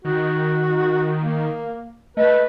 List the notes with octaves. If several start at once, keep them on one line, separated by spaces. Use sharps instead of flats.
D#3 F#4
A#3
A3 B4 D#5